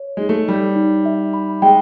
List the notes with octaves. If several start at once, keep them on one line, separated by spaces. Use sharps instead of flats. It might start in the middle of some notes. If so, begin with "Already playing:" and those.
Already playing: C#5
G#3 D#4
A3
G3 D#4
D#4
E5
B5
G#3 G5